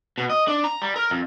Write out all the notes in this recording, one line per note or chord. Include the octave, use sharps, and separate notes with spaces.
B2
D#5
D4
A#5
G3
A#4
F2